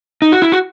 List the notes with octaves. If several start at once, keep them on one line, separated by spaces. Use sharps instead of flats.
D#4
F#4
E4
F#4